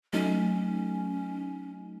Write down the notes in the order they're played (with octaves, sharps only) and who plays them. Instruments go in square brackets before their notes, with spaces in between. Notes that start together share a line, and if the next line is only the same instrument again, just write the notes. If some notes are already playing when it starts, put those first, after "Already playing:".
[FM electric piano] F#3 A3 D#4 [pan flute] C#4